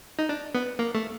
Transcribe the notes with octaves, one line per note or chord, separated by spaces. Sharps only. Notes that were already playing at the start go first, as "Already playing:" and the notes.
D#4
D4
B3
A#3
A3